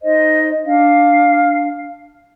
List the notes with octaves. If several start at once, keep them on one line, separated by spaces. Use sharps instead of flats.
D#4 C5 D#5
D4 F5